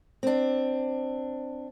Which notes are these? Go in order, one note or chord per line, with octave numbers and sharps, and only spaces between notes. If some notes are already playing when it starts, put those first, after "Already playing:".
C4 D4